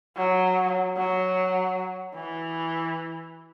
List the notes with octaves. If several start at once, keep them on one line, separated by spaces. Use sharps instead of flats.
F#3
F#3
E3